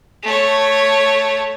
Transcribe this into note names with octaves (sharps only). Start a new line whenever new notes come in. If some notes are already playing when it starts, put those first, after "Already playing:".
A3 C#5